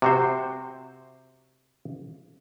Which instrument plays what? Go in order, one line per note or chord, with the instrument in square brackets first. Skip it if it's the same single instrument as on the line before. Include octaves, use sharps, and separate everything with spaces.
[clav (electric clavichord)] C3 F#4 C5